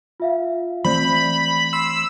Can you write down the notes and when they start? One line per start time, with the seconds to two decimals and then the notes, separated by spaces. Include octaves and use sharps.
0.20 F4 E5 F5
0.84 E3 A3 C4 C5 D5 B5 G6
1.73 C6 E6 C7